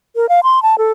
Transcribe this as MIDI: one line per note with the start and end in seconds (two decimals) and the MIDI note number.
0.16 0.29 70
0.29 0.40 77
0.43 0.62 84
0.63 0.78 81
0.78 0.92 69